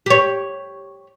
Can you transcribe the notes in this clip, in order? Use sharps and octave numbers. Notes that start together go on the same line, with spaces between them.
G4 C#5